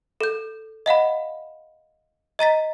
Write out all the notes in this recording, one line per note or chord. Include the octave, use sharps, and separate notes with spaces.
A4 G6
D#5 F5 F#5 B5
D#5 A#5 A6 B6